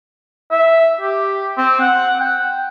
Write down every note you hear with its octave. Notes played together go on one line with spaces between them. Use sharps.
E5
G4
C4
F#5
G5